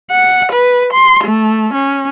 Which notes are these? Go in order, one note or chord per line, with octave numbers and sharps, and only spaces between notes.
F#5
B4
C6
A3
C#4